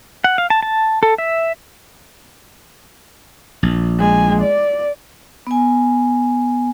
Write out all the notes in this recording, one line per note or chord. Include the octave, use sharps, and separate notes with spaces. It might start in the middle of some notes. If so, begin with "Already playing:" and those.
F#5
F5
A5
A5
A4
E5
A#1
G#3 G#5
D5
B3 G#5